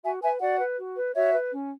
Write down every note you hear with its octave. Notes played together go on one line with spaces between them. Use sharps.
F#4 E5 G#5
B4 E5 G#5
F#4 D5 F#5
B4
F#4
B4
F#4 C#5 E5
B4
C#4